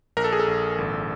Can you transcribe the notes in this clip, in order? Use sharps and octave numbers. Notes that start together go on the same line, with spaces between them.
A#1 A#4
A4
G#4
A4
A#1
G#1